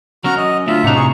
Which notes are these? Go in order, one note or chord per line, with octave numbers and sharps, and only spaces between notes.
F#3 C#4 F#4 A#5 F6
D#5
A3 D4 F4 F#4 E5
A2 C3 D4 D#4 F#5 A#5
G#4 C#6